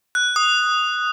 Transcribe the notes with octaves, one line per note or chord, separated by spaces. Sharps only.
F#6
D#6